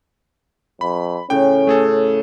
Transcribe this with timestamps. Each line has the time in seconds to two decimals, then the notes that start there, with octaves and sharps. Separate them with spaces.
0.81 F2 B5
1.30 A2 C#3 C#4 G5
1.67 A3 G#4 A4